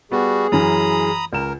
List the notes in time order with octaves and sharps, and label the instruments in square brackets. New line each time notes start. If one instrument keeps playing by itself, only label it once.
[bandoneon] G3 F#4 [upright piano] B3 [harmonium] G#4
[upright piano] F#2 E3 [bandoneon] A#5 B5 D#6
[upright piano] C#2 E7 [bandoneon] A#4